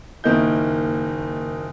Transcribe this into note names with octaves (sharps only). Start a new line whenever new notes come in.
F#1 D#3 A#3 E4 D#5 G6